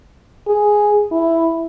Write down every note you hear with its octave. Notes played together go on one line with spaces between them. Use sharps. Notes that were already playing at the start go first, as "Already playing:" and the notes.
G#4
E4